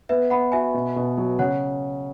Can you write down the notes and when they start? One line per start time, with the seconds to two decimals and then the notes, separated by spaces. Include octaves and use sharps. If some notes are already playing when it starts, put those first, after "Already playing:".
0.09 B3 B4 E5
0.30 B3 F#5 B5
0.52 F#4 E5 G#5
0.74 B2
0.96 B2
1.17 F#3
1.39 C#3 C#5 F#5